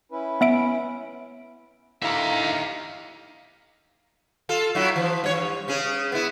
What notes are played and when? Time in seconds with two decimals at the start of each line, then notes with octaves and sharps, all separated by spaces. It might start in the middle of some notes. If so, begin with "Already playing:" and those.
0.12 C#4 E4 B4
0.41 B3 E5 D7
2.02 D2 D#3 D#4 E4 G4 E5 F5 A#5
4.49 F4 A4
4.75 F#3 E4 F#4
4.96 E3 F3
5.24 G2 C#5
5.68 C#3 C#4 G#4
6.12 B3 E4